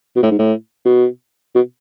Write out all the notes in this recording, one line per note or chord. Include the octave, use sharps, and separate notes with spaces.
B2
A2
G#2
A2
B2
B2